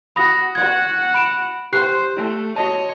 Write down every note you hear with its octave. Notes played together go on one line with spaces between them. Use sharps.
F#4 B5 D#6 A#6
F#4 F#5 G#6
B5 D7 E7
G4 C5 F#6 C7
A3
F#4 C#5 D#5 A5